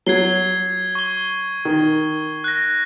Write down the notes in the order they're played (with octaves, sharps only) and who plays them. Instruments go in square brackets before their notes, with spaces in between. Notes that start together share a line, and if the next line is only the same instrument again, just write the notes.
[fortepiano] F#3 [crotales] G#6 C7 G7
[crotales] C#6 G7
[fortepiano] D#3
[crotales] F#6 A#6